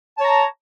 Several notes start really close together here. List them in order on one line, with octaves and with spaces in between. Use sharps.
A5 C#5 A#5